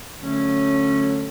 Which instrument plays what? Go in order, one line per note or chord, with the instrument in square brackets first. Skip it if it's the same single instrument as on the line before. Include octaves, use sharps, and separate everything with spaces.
[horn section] D3 F#3 A3 C#4